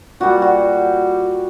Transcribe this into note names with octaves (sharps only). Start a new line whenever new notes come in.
A#2 G3 F#4
F#4